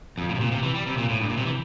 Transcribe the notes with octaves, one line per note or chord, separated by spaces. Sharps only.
F2
A2
C3
A#2
C3
E3
G3
C3
A#2
A2
G2
A#2
C3
E3